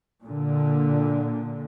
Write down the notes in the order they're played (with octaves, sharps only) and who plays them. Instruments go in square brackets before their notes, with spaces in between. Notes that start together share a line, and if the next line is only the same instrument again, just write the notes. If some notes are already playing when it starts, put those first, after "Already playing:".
[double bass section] A#2 D3